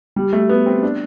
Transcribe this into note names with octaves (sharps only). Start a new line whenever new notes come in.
G3
A3
B3
C4
D4